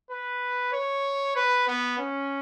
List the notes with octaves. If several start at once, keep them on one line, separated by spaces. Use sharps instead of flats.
B4
C#5
B4
B3
C#4